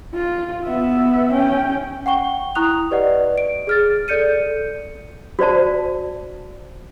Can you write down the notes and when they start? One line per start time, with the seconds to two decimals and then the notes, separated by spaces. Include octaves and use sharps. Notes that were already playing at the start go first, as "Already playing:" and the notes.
0.13 F4
0.64 B3 E5
1.32 C#4 G5
2.06 F#5 G5 C#6 G7
2.55 E4 A#5 C#6 D#6 F#6 F7
2.91 G4 B4 D5 D#5 F#5
3.38 D7
3.67 G#4 F6 A6
4.08 A4 D5 G6 C#7 D#7
5.39 F#4 C5 D5 A5